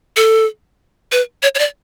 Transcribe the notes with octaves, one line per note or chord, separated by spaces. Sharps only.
A4
B4
C#5
C#5
D5